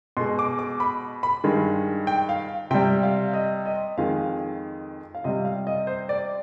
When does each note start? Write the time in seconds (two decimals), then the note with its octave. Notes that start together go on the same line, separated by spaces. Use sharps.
0.17 B2 G#3 C6
0.39 D6
0.59 D6
0.80 B5
1.23 B5
1.44 G2 D#3 G#3
2.07 G5
2.29 F5
2.71 C3 G3 G5
3.03 F5
3.34 D#5
3.66 D#5
3.97 F2 D#3 G#3 F5
5.15 F5
5.24 C3 G3 D#5
5.45 F5
5.67 D#5
5.87 C5
6.09 D5